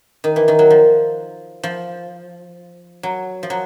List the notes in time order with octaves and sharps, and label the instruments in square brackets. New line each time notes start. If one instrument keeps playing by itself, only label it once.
[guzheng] D#3
E3
D#3
F#3
F3
F3
F#3
F3
F#3